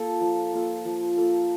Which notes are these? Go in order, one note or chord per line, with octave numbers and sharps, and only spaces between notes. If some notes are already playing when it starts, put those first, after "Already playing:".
Already playing: A#3 F4 A4
F3
A#3 F4 A4
F3
A#3 F4 A4